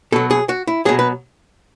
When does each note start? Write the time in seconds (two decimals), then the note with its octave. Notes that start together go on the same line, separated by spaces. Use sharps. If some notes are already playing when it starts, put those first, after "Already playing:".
0.12 B2 F#3 A4
0.31 G#4
0.49 F#4
0.67 E4
0.85 B2 F#3 G#4
0.99 B4